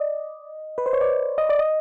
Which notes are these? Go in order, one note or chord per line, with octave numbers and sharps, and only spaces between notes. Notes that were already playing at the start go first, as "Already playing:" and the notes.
Already playing: D5 D#5
B4
C5
C#5
D5
D#5
D5
D#5